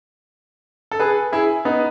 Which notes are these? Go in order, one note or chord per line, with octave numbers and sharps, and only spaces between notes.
A4
G#4 B4
E4 G#4
B3 D#4